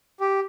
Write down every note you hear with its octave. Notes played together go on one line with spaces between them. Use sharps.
G4